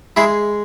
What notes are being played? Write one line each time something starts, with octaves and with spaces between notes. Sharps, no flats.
G#3 E4 G#4